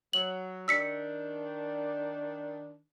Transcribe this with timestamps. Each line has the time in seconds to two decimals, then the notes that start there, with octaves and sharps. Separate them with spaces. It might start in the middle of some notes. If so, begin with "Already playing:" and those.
0.13 F#3 F#7
0.68 D#3 D4 E6 B6 C#7